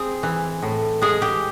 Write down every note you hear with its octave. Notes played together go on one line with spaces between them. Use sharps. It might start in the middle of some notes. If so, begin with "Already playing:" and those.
Already playing: C4 G#4
E3
A2
G#3 G#4
G4